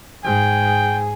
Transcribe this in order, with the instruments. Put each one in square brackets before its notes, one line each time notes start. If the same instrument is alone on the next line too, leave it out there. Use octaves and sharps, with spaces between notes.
[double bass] G#2 [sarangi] G#4 [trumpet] G5